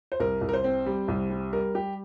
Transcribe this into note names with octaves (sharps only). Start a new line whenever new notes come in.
C5
C2 A#4
C2
A#4
C5
C4
G3
C2
G3
G3 A#4
G3 G4